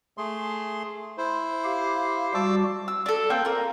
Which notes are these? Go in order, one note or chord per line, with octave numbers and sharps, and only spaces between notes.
A3 G#4 C6
E4 C5
G4 F5
G3 F#4 A5 D6 E6
E6
D4 A4
A#3 C4 G5
F4 A#4 D5